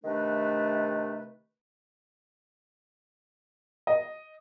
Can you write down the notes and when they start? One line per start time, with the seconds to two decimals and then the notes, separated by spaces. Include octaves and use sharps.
0.04 C3 D#3 A3 D4 B4
3.87 D#5